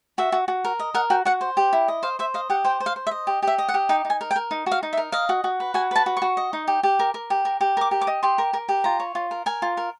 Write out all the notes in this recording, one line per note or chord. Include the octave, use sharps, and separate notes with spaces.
F#4 E5
F#4
F#4
A#4
D#5
A#4 F#5
F#4 G5
F#4 F#5
C5
G4
E4
D#5
C5 F5
C5 E5
D#5 F5
G4 F#5
C5 G5
C5
F5
C5
E5
D#5
G4
G4 E5
D#5
F#5
G4
D#4 G5
D#4
G#5
A#4
G5
A#4
D#4
F#4
F5
D#4
E5
A#4
D#5 F5
F#4
F#4
B4
F#4 G#5
B4 A5
F#4
C#6
F#4
D#5
D#4
G4
G4
A#4
A#4
G4
A#4
G4
A#4 D6
G4
D6
D#5
G4 C6
A#4
A#4
G4
F4 A#5
C#5
F4
A#4
A#4 G#5
F4
A#4